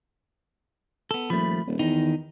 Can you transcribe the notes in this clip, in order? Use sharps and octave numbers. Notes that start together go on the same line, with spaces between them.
B3 A4
D#1 F3 A3 B5
D#1
E2 D#3 D#4